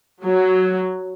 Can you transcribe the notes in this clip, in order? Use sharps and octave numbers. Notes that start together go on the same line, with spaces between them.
F#3